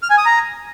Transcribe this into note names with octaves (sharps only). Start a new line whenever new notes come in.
F6
G#5
D#6
A#5